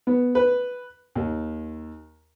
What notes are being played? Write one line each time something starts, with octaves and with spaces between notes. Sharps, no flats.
B3
B4
D#2